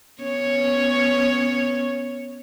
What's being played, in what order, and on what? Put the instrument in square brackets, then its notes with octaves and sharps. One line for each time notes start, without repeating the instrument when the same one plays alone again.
[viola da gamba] B3 C#4 C#5